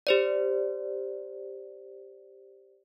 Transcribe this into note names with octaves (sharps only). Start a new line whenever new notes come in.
G4 C5 D5